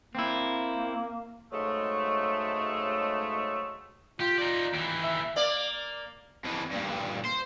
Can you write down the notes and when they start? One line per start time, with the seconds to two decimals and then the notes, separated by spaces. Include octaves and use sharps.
0.15 A#3 C4 E4
1.52 G#2 C#3 F#3 G#3 A3
4.20 F4 G4
4.38 D#4 D5
4.74 D#2 E3
5.03 E5
5.36 A#3 D5
6.44 F2 E3
6.71 G2 A#2
7.25 C5